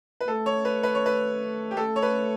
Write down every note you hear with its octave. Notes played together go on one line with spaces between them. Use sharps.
B4
A3 A4
C#5
B4
B4
C#5
B4
G4
A3 A4
C#5
B4